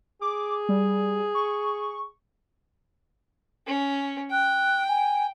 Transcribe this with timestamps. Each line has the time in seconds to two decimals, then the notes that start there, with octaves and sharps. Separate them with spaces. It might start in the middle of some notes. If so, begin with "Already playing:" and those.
0.21 G#4 D6
0.69 G3
1.35 C#6
3.67 C#4
4.31 G5 F#6
4.88 G#5